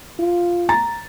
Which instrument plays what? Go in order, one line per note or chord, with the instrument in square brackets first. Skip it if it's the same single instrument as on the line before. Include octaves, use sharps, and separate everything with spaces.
[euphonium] F4
[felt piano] A#5 A6